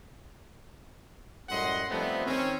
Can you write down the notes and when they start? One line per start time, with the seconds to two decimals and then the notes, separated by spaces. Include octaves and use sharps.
1.50 F#2 A2 G3 D#5 F#5 C6
1.90 F3 G3 A3 B3 C4 D#4
2.26 D#3 C4 C#4